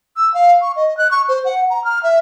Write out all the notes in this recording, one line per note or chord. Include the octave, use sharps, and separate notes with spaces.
E6
F5
C#6
D#5
F#6
C#6
C5
F#5
A#5
F6
E5